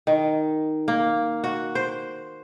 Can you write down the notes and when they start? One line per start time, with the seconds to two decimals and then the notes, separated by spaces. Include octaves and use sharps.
0.07 D#3
0.88 A#3
1.44 F#4
1.75 C5